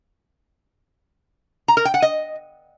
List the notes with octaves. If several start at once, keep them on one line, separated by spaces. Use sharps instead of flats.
A#5
A#4
G5
F#5
D#5